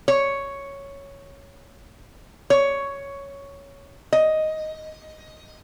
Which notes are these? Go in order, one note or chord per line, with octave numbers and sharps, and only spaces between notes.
C#5
C#5
D#5